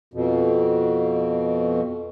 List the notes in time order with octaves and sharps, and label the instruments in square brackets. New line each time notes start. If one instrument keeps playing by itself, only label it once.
[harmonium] F2 B2